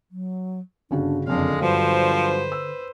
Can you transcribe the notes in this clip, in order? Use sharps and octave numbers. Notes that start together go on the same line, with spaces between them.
F#3
G1 C#3 D4 F#4
F#1 F2 D3 G#3 D4 F5
G2 F3 F#3 B4 C5
E6